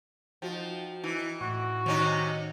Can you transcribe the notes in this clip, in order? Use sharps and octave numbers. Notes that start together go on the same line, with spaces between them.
F3 D#4 F#4 G5
E3 D#4
A2 F#4
C3 D#3 C#4 D#4